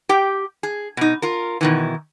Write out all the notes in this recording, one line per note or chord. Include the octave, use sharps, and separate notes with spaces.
G4 G5
G#4
B2 D#4
F4 A#4
B2 D#3 E3